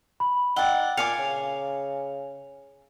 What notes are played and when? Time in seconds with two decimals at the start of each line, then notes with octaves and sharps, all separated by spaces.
0.20 B5
0.56 D#4 D5 F#5 G5 E6 G7
0.97 A#2 F5 G#5 D6 C#7
1.19 C#3